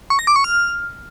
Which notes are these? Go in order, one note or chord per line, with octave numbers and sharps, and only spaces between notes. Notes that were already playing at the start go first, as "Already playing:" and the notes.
C#6
A#6
D6
C#6
F6